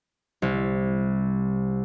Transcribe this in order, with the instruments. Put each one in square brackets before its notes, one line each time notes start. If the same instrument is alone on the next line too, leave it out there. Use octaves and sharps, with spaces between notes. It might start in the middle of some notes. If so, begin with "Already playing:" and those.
[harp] C2